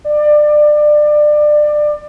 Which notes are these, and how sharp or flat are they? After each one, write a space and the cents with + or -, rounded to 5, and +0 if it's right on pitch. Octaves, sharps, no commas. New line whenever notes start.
D5 +25